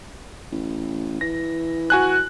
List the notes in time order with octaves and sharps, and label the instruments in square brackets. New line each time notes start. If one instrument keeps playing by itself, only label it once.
[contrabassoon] A1
[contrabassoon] E3 [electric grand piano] A#6
[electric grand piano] F#4 G#5 F#6